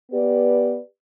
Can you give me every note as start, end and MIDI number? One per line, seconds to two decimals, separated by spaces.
0.12 0.78 59
0.12 0.78 67
0.12 0.78 71
0.12 0.78 74